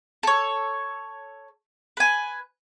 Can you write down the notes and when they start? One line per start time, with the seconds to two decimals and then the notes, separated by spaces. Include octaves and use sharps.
0.23 A4 C#5
1.97 B4 G#5